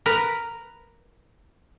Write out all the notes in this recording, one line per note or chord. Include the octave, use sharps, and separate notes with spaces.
A#4 B4